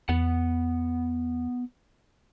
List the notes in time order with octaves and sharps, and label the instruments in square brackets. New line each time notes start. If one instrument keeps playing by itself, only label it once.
[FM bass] E2 [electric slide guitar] B3 F#5